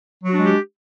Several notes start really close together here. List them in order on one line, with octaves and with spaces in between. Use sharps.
F#3 F#4 D4 G#3 G4